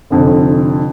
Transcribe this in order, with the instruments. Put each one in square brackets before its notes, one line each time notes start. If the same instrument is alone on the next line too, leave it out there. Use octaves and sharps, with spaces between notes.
[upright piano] F1 F2 D3